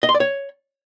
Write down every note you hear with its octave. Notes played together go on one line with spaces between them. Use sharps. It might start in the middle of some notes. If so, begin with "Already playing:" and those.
D#5
C6
D5
C#5